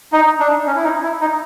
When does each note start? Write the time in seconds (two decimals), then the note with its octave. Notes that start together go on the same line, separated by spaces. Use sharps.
0.13 D#4
0.40 D4
0.67 C#4
0.76 E4
0.84 D#4
1.03 E4
1.21 D#4